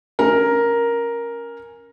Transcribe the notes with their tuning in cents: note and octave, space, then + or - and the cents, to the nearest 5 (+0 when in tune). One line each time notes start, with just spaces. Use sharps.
C#4 +0 A#4 +5